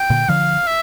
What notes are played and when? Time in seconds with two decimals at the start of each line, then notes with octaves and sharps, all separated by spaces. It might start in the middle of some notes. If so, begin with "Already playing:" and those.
Already playing: G5
0.10 A#2 D3
0.28 D3 F3 F5
0.67 E5